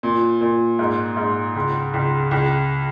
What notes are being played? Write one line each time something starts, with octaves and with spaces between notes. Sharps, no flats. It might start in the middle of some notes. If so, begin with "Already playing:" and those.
A#2
A#2
G#2
G#2
C#2
C#2
C#2